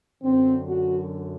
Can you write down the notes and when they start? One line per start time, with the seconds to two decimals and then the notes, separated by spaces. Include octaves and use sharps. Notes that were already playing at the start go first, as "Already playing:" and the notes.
0.23 F#2 D3 C4
0.67 F#4